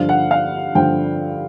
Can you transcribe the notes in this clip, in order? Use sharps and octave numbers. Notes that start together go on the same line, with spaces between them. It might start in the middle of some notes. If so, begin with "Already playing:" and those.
Already playing: G2 D3 F3 F5
F#5
F5
G2 D3 F3 G5